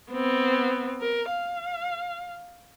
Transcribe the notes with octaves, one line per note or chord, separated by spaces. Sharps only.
B3 C4
A#4
F5